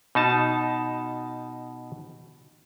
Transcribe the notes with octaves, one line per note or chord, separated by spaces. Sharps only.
B2 D#4 A5